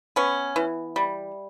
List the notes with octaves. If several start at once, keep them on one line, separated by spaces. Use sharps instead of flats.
B3 C#4
E3
G3